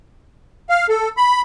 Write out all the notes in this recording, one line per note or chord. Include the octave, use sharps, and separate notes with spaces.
F5
A4
B5